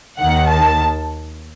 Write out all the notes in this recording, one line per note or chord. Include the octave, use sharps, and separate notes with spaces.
D#2 D#3 F#5
A5